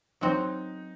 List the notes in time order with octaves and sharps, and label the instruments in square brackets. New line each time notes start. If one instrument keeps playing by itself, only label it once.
[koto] F#3 C4 F#4 [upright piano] D#4